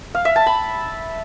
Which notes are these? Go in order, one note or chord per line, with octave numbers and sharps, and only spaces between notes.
F5
E5
A5
B5